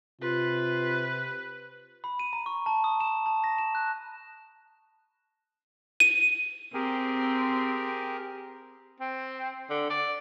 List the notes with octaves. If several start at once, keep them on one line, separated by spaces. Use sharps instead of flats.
C3 F4 B4
B5
D#7
A#5
C#6
A5
D#6
E7
A5
A#6
E7
F#6
D#7
C4 G4 G#4 A#4
C4
D3
D5